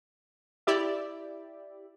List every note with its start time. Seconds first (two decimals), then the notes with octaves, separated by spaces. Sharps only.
0.67 E4 G4 D5 E5